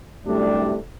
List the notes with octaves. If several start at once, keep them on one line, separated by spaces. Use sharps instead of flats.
F#2 A2 C3 G3 A3 D4